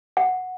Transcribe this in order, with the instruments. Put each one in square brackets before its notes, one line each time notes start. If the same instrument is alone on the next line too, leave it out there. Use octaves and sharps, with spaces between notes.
[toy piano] F#5